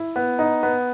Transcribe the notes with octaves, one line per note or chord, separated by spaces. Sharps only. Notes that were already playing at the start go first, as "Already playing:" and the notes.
Already playing: E4
B3
D#4
B3